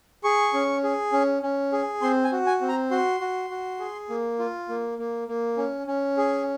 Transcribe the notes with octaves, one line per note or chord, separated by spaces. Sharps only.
G#4 C#6
C#4
G#4
C#4
C#4
G#4
C4 C6
G#5
F#4
G#5
C4
A#5
F#4 C6
F#4
F#4
G#4
A#3
F4
A#3
A#3
A#3
C#4
C#4
G#4